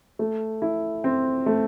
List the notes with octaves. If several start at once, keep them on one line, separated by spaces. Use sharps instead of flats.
A3
E4
C4
A3